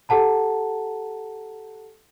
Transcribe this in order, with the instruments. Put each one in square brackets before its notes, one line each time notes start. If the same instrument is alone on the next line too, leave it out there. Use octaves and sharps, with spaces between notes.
[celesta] G4 A4 F#5 A5 A#5